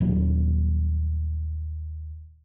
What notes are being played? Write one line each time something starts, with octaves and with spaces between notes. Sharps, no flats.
D#1 F#3